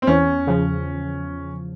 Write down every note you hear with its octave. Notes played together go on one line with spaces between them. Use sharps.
C4
E2 C#4
C#3 F3